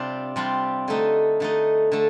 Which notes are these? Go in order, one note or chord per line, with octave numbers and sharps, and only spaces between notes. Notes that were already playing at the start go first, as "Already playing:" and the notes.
Already playing: C3 G3 D4 F4
C3 G3 D4 F4
D3 A3 D#4
D3 A3 D#4
D3 A3